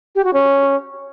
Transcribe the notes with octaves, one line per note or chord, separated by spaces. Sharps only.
G4
F#4
C#4